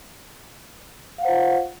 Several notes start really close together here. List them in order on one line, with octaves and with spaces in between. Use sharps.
F5 F#5 C5 F4